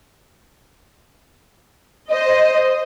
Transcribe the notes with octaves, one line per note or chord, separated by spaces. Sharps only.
C5 D#5